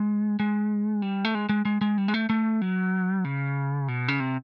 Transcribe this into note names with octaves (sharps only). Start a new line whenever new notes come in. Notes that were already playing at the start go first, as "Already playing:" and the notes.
Already playing: G#3
G#3
G3
A3
G#3
G#3
G#3
G#3
G3
G#3
A3
A3
F#3
C#3
B2
C#3
C3